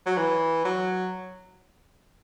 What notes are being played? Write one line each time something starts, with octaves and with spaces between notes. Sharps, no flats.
F#3
E3
F#3